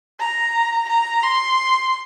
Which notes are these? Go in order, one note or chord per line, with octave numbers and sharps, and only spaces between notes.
A#5
A#5
C6